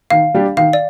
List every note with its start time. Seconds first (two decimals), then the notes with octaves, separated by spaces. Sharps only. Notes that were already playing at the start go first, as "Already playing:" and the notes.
0.10 D#3 F5
0.34 G3 D4 G4
0.57 D#3 F5
0.73 D5